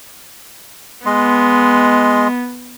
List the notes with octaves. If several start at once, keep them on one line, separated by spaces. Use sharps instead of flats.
G#3 B3 D#5 C6